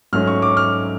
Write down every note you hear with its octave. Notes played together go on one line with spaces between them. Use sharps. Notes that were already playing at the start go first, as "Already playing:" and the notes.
G#2 F#3 A3 C#4 F6
C#6
D6
F6